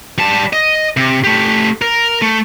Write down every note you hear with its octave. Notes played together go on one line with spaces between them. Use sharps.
G3 A5
D#5
C3
A3 G4
A#4
A3